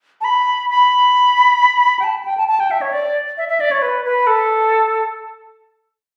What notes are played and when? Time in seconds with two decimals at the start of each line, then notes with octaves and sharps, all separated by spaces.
0.21 A5
0.24 B5
0.69 B5
1.99 G5
2.04 A5
2.25 G5
2.38 A5
2.48 A5
2.60 G5
2.71 E5
2.81 C#5
2.93 D5
3.37 E5
3.48 E5
3.60 D5
3.71 C#5
3.82 B4
4.05 B4
4.27 A4